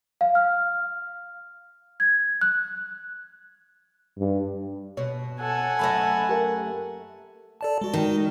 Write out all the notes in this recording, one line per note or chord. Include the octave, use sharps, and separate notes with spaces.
F5
F6
G#6
F#6
G2
B2 C#5
A4 F#5 G#5
F#2 A3 D#5 A5 B5
G4 A#4
A4 D5 A5
G#3 F#4
D#3